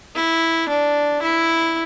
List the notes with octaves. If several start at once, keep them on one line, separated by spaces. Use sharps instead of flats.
E4
D4
E4